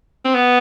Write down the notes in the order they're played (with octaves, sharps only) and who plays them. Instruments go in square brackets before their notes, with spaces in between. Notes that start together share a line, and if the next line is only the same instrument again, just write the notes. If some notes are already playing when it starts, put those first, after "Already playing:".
[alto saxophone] C4
B3